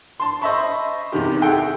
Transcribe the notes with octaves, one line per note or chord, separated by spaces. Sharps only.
A5 C6
C5 D#5 E5 A5 B5 C#6
E2 C3 D#3 G4
F#4 G#4 A4 E5 F#5 G5